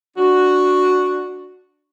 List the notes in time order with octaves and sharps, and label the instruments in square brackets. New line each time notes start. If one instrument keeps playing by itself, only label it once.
[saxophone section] D4 F#4